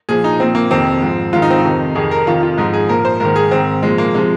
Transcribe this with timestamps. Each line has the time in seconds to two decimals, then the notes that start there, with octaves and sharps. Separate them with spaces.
0.09 A#2 F3 G#4
0.24 D#4
0.40 A#2 F3 C4
0.55 A#3
0.71 F2 C3 D#3 C4
1.02 G#2 F3
1.33 G#2 D#3 F4
1.42 D#4
1.51 C4
1.59 D#4
1.64 F2 C3 D#3
1.95 F2 C3 D#3 G#4
2.11 A#4
2.27 F2 C3 D#3 F4
2.43 F4
2.58 G#2 F3 D#4
2.73 G#4
2.89 A#2 F3 A#4
3.05 C5
3.20 G#2 D#3 A#4
3.36 G#4
3.51 G#2 D#3 C4
3.83 A#2 F3 G#3
3.98 A#3
4.14 C3 F3 G#3